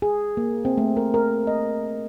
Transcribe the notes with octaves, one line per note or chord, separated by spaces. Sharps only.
G#4
A#3
C4
A3
A#4
A#4
D#5